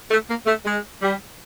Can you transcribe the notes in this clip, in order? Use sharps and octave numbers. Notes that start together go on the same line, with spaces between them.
A3
A#3
A3
G#3
G3